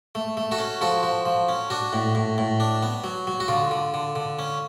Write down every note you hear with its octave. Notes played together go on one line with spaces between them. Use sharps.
A3
A3
F#4 A4
C#4
F3 F#4 A4
F3
F3
C#4
D4 F#4
A2
A2
A2
D4
B3
F#3
F#3
F#4
D3 F4
D3
D3
D3
C#4